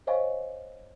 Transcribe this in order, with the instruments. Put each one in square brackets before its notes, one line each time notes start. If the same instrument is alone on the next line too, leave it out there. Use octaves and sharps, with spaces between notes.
[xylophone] C5 C#5 D#5 F5 G#5 C#6